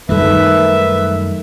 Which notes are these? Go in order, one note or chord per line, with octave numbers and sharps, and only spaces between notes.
F#2 D#3 G3 A3 A4 B4 E5